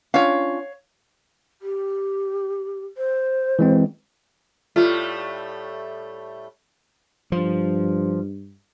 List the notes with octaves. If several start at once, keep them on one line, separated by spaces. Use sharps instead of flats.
C#4 D4 F4 C#5 F5
G4
C5
E3 G#3 C4
A2 G3 A3 F4
G2 F3